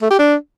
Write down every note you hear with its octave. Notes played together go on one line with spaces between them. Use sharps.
A3
G4
D4